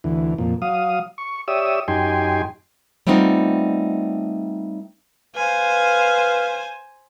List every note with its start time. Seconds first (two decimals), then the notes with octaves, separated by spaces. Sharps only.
0.04 D2 E3
0.38 F2 A#2
0.62 F#3 F5 D#6
1.18 C#6
1.48 G4 C#5 D5 E5 D#6 E6
1.88 F#2 D#4 G4 G5 G#5 C6
3.07 G3 A3 B3 C4 D#4 F4
5.35 B4 C5 F5 G#5